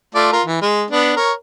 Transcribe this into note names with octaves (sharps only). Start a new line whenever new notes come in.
A3 F4 D5
F4 A#4
E3
G#3
B3 D4
A#4 C#5